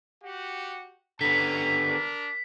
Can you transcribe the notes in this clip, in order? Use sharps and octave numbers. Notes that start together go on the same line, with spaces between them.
F#4 G4 F#5
D3 B3 C#4 A#5 B6
D4 A#4